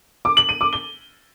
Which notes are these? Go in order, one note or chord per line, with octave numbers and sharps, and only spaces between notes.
D6
F#7
D#7
D6
G7